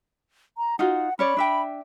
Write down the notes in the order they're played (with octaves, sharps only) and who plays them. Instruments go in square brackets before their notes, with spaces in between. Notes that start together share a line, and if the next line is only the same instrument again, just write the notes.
[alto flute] A#5
[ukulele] D#4 F4 F#4 [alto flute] F#5
[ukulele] C#4 C#5 D5 [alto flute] B5
[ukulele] D4 E5 G5